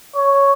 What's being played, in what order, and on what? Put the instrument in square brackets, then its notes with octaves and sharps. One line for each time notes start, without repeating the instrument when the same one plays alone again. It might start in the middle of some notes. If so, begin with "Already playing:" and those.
[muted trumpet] C#5